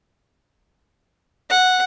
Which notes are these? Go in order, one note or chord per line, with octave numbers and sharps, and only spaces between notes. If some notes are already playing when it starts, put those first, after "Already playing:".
F#5